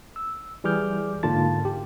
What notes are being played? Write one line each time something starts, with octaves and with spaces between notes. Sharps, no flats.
E6
E3 G3 G#4 D6 F6 G6
G#2 D3 A#3 F4 A5 A6
G4